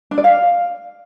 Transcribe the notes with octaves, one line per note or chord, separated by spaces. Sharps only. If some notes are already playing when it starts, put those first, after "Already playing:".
D4
D5
F5